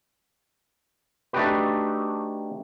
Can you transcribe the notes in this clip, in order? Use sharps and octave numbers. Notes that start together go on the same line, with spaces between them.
A3 D4 D#4 F#4 G4 B4